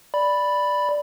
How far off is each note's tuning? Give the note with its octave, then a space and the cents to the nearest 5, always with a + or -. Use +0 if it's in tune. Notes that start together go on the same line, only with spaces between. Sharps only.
D5 +0 B5 +0